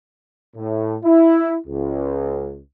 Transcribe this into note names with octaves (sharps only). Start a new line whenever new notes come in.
A2
E4
C#2